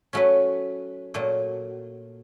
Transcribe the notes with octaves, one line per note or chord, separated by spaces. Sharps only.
F#3 A3 C#4 F#4 B4
A#2 F#3 A3